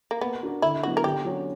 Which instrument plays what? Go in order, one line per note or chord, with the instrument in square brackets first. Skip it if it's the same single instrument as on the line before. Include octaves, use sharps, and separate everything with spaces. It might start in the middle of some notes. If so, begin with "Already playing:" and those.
[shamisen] A#3
[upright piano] A#3 [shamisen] B3
[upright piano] D4 F#4 A#4
[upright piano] D3 [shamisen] E4
[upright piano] F#3 B3 E4 [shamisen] F#4
[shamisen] A#4
[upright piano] D3 [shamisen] G4
[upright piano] F#3 C#4 F#4